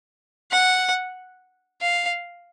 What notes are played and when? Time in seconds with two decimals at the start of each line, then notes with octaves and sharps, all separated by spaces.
0.52 F#5
1.82 F5